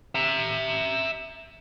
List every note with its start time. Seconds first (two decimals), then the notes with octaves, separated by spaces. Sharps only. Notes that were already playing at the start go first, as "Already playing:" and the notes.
0.15 E5 A#5